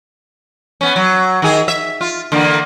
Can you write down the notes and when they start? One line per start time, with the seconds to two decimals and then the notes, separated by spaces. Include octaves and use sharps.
0.81 B3 C#4
0.96 F#3
1.42 D#3 G#4
1.68 E5
2.01 F4
2.32 D3 E3 A#3